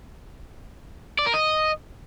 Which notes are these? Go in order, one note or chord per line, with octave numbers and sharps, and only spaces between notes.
D5
A#4
D#5